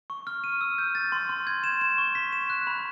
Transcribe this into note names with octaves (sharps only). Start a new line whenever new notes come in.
C#6
F6
D#7
E6
G6
A6
C6
C6
G#6
E7
E7
C#6
B6
E7
F#6
B5